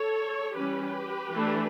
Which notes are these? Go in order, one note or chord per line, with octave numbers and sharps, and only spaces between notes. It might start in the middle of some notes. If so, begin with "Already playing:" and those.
Already playing: A4 C#5
E3 G3 C#4 G4 B4
E3 A3 D4